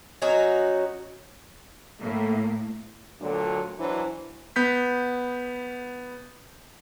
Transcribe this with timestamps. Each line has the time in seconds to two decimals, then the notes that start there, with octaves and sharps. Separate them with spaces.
0.22 F#3 C#4 D#4 F#4
2.00 A2 A#3
3.21 D2 A#2 D3 F#3
3.79 E3 F#3 D4 C5
4.56 B3 G6 B6